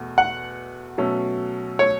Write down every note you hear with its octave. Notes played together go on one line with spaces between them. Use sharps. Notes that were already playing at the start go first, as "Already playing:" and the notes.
Already playing: E2 B2 A3
F#5
B2 F#3 A3 C#4 A4
C#5